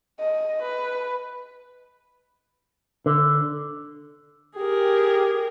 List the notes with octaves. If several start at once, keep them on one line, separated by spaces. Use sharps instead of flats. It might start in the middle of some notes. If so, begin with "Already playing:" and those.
D#5
B4
D3
G4 G#4 A#4